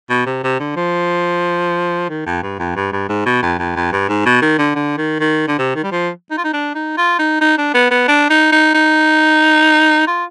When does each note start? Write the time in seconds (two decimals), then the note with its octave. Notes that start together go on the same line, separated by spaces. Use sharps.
0.10 B2
0.26 C3
0.44 C3
0.60 D3
0.77 F3
2.10 D#3
2.26 F2
2.43 G2
2.59 F2
2.76 G2
2.93 G2
3.09 G#2
3.26 B2
3.42 F2
3.59 F2
3.76 F2
3.92 G2
4.09 G#2
4.26 B2
4.42 D#3
4.59 D3
4.75 D3
4.97 D#3
5.20 D#3
5.48 D3
5.58 C3
5.75 D#3
5.84 G3
5.92 F3
6.31 D#4
6.38 F4
6.44 D#4
6.53 D4
6.75 D#4
6.97 F4
7.19 D#4
7.41 D#4
7.58 D4
7.74 B3
7.91 B3
8.08 D4
8.30 D#4
8.52 D#4
8.74 D#4
10.07 F4